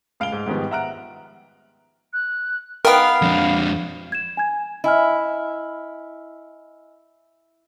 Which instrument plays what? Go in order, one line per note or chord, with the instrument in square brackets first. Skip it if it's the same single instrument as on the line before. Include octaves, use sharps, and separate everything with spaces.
[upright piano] C#2 F5 D7 F7 G7
G#2
G#2 D#3 F3 G3 B3
E5 F#5 A#5 F6 F#6 D7
[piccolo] F#6
[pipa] D#3 B3 [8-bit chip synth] A#4 G5 [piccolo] F5
[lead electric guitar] F2 D4
[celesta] G#6 E7
G#5 G#6
[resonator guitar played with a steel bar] E4 [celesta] D#5 G#5 F6